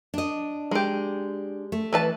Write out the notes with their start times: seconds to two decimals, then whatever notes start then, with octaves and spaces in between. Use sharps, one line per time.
0.14 D4 D#5
0.71 G#3 G4
1.72 A3
1.93 E3 B4 A5